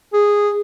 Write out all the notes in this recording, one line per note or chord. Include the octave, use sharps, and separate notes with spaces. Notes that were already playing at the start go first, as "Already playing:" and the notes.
G#4